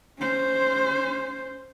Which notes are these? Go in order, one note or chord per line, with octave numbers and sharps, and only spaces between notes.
C#4 C5